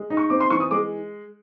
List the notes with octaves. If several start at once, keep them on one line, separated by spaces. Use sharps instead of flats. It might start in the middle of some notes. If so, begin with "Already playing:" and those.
Already playing: G#3
D#4
C#6
C4 D6
C6
E3 C#6
D#6
G#3 D6